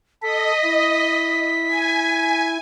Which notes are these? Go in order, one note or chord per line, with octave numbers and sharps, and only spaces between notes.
A4 D#5 B6
E4
G#5